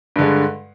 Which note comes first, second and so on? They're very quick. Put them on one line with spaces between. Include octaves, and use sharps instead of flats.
G2 D3 G#3